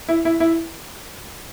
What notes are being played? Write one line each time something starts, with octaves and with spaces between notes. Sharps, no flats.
E4
E4
E4